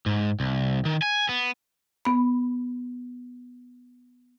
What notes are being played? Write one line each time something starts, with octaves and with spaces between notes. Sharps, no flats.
G#2
C2
D#3
G#5
B3
B3 B5